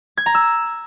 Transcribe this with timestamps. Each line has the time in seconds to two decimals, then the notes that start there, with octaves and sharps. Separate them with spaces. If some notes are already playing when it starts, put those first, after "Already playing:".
0.17 G#6
0.26 A#5
0.35 E6